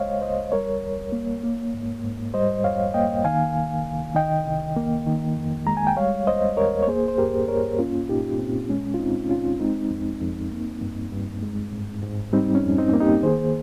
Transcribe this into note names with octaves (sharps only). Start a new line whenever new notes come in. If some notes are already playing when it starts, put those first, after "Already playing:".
Already playing: C#2 G#3 C5 C#5 D#5 F5
C#2 C5 D#5
G3 A#4 C#5
D#2
A#3
A#3
G#2
G#2
G3 C5 D#5
F2 C#5 F5
A#3 D#5 G5
D#3 F5 G#5
C2
C2
D#3 D#5 G5
C2
A#3
D#3
F2
G#3 A#5
G#5
G5
G3 C#5 F5
D#2 C5 D#5
D#2 A#4 C#5
C#5
A#3 G#4 C5
C5
G2 G4 A#4
G2 A#4 C#5
A#3 C#4 F4
A#2 D#4 G4
A#2 C4
G#3 C#4
F4
C#2 C4 D#4
C#2 C#4 F4
G#3 C4 D#4
F2
F2
A#3
G2
G2
G#3
G#2
G#2
G3 C4 D#4
C#4
F2
C4 D#4
A#3
D#4 G4
D#3 G#4 C5